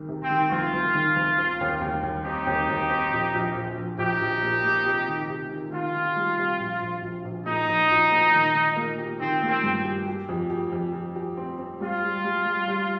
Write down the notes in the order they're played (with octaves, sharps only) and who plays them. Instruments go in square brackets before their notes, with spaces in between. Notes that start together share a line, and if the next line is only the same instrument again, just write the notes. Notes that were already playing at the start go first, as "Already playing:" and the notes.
Already playing: [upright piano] C2 D#3
C3
[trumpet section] C4
[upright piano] D#3
[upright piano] C2 [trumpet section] F4
[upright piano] C2
D#3
C2
C4
D#2
D#2
D#2
[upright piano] C4 [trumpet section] D#4 G4
[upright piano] D#2
D#2
C4
A#1
A#1
A#1
A#1
[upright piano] A#1 [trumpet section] D#4 G4
[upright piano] A#1
A#2
A#2
C3
D#3
C3
D#3
[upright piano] D#3 [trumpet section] F4
[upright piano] D#3
G3
C3
A#1
A#1
A#1
A#1
[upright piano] A#2 [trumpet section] D#4
[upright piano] A#1
A#1
A#2
D#3
D#3
A#3
G4
[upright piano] D#3 [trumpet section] C4
[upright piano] A#3
[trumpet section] C4
[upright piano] G2
G4
G4
F2
G4
F2
F2
G4
C4
C4
[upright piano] G3 [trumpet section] F4
[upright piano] G3
G3
G3
G3